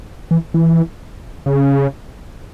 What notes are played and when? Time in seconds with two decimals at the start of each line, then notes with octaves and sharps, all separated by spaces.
0.31 E3
0.54 E3
1.46 C#3